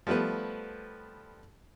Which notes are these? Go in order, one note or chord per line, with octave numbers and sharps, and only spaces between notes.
F3 G3 A3 B3 B4